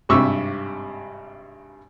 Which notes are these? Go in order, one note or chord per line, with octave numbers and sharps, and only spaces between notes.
G#1 G2 C3 C#6 E6